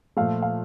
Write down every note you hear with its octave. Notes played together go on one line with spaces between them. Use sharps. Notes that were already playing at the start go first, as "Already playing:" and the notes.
A#2 F3 A3 F5
F5